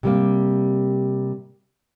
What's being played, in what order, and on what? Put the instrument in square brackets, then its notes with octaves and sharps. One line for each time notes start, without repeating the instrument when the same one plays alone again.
[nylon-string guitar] C3 G3 A#3